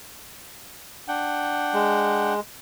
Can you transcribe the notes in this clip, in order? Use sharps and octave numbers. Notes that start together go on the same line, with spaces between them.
D4 F#5 G5
G#3